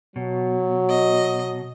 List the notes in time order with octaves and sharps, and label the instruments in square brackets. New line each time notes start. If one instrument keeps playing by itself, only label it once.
[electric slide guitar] B2 [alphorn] F#3
[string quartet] D#5